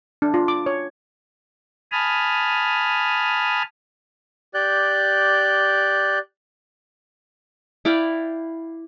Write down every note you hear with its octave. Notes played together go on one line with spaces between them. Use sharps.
D4
F4
D6
C#5
G#5 A5 B5 D#6 F6
G4 D5 F#6 G6
E4 D5 F5 G5